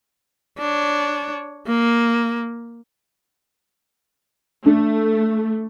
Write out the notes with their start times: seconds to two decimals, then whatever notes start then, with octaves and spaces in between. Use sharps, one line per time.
0.59 D4 C#5
1.67 A#3
4.66 A3 D4